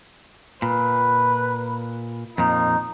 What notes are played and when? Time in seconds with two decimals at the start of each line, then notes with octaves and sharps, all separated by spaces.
0.62 A#2 B4
2.38 F2 A#2 D#4